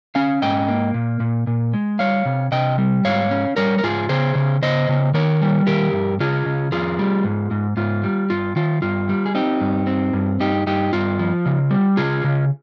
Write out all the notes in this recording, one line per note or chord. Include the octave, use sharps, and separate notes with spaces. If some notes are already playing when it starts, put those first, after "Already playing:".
C#4 F5 G#5
G#2 D#5 G5
A#3
A#2
A#2
A#2
G#3
G3 C#5 F5
C3
C3 D#5 G5
G3
G#2 C#5 F5
C#4
G3 A#4 C#5
A#4
G#2 F4 G#4
C#3 G#4 C5
C#3
C#3 C5 D#5
C#3
D#3 A#4 C#5
G3
D#3 G4 A#4
G2
C#3 F4 G#4
C#3
F2 F4 G#4
G3
G#2
G#2
G#2 F4
G3
G2 F4
D#3 F4
G2 F4
G3
G#4
C4 D#4 G4
G2
C4
G2
G2 D#4 G4
G2 D#4 G4
G2 F4
F3
C#3
G3
C#3 F4 G#4
C#3